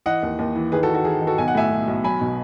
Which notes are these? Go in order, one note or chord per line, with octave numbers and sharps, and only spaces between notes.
E3 D#5 F#5
D#2
D#2
E3
D#3 G#4 B4
F#4 A4
D#3
F#4
D#3 G#4
D#3
F#4 A4
B1 G#5
F#5
A2 E5 G#5
B1
B1
F#3 G#5 B5
B2